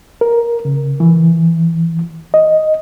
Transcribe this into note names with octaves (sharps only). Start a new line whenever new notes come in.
A#4
C#3
E3
D#5